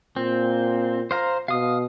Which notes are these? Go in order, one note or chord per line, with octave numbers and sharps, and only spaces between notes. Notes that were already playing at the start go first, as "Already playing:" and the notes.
A#2 C4
C5 F5 A#5
B2 F5 D#6